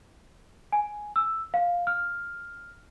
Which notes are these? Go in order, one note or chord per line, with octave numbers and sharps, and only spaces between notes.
G#5
E6
F5
F6